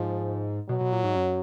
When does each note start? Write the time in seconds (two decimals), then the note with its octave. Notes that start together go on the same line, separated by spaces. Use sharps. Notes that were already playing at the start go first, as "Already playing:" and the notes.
Already playing: G#2 F3
0.69 B2 F#3
0.81 B2
0.92 A#2
1.04 G#2
1.15 F#2